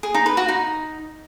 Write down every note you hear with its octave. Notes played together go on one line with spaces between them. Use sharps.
G#4
D#4
B4
F#4
D#4